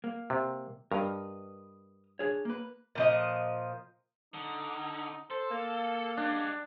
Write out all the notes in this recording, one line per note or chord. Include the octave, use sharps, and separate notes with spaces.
A#3
C3
G2 A#4 B4 D#5
D4 G#4 C#5
A#3 B4
A#2 F3 D#5
D3 D#4
A4 C5
A#3 F5
G#3 D4 G4